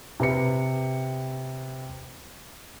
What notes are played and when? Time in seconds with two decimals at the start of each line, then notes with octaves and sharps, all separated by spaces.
0.20 C3 B4 C#7